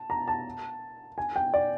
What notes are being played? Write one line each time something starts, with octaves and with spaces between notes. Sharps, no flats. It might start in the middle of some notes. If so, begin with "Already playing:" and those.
Already playing: A5
A#5
A5
G#5
G5
D5